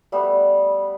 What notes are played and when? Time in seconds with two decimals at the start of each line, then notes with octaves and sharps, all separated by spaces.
0.12 G3 A3 B3